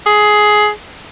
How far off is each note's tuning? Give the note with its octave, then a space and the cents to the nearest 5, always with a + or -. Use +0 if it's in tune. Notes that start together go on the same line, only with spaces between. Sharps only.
G#4 +15